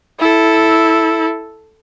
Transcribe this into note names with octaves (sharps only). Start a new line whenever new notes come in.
E4 A4